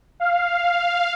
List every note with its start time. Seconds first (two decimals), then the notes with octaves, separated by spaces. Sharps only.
0.20 F5